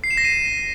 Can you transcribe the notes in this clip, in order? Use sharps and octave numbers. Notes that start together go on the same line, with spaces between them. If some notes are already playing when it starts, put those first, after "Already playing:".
C7
E7
A#6
D#7